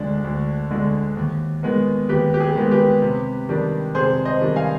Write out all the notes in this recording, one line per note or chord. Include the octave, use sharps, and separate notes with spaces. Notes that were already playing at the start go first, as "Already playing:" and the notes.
Already playing: D2 D3 G#3 D4
D2
D3 G#3 D4
D#2
D#3 G#3 B3
D#2 G4 B4
G4
G#4
D#3 G#3 B3
G4 B4
C3
D#3 G3 D4
C3 G#4 C5
C5 D#5
D#3 G3 D4
F5 G#5